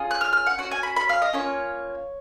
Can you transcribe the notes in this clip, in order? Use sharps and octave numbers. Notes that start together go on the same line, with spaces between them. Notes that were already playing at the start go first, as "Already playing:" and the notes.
Already playing: C#4 F4 G#4
F#6
F6
F6
F#5
C#4 F#4 F#5
G#5
B5
B5
F5
D#5
A#3 C#4 F4 C#5